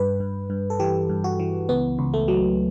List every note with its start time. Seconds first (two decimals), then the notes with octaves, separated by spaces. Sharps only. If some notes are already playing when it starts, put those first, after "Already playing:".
Already playing: G2 B4
0.20 G2
0.50 G2
0.70 A4
0.80 E3 G4
1.09 G2
1.24 F#4
1.40 E3
1.69 C#2 B3
1.99 C#2
2.14 A3
2.28 F#3